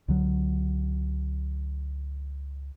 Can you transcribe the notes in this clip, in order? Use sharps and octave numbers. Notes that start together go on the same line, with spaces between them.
C#2 D3 F#3